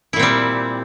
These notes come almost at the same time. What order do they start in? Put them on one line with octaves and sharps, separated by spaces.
E4 A#2 C4 G3